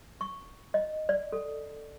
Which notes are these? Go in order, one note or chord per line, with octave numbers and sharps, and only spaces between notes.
C#6
D#5
D5
A4